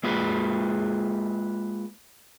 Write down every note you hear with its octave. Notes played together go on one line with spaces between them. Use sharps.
G#3 A#3 F4 G#4 B4